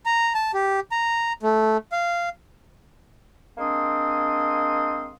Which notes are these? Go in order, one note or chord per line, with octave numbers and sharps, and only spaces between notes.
A#5
A5
G4
A#5
A3
F5
G#3 A#3 C4 D4 C6 D#6